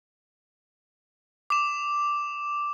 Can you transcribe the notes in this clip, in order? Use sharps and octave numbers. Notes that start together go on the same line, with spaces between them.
D6 E7